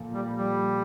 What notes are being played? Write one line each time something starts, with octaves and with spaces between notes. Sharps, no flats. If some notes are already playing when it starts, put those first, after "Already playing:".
Already playing: A#2 F3 A#3 A4
G3
G3